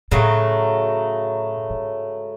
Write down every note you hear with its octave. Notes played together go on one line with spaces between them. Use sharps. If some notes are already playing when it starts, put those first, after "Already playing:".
A2 C#3 F#3 A3
G#2